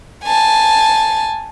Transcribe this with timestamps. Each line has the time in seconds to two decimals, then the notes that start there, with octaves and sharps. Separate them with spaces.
0.24 G#5 A5